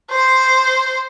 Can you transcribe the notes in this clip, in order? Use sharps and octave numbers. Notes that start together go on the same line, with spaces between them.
C5